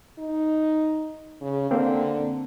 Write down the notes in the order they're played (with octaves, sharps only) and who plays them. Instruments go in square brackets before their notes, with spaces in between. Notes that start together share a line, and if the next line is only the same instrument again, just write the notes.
[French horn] D#4
C#3
[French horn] D3 [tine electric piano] A#3 C4